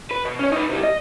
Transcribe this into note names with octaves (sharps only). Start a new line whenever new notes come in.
B4
B2
C#4 C#5
D#4 B4
C3 G3
D#5